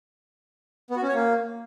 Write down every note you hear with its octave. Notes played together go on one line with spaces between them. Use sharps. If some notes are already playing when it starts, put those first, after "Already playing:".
B3
F#4
C#4
C#5
A#3